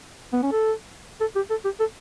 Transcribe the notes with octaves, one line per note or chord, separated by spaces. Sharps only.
B3
C#4
A4
A4
G4
A4
G4
A4